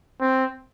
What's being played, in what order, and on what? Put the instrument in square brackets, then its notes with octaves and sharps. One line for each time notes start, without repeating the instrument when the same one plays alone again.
[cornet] C4